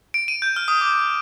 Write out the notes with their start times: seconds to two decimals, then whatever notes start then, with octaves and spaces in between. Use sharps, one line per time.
0.14 D7
0.28 D#7
0.42 G6
0.56 F6
0.68 D#6
0.81 D6
0.94 D#6